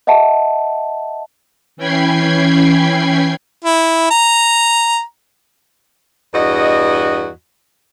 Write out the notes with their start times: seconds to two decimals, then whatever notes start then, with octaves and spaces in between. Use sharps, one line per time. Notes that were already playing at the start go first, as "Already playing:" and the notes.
0.07 D#5 E5 F#5 A5
1.77 E3 C#4 G5 B5 G#6 C7
3.64 E4
4.11 A#5
6.34 E2 G2 F#4 D#5